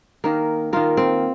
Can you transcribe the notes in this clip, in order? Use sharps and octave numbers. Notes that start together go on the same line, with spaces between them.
D#3 A#3
D#3 A#3 F4
C4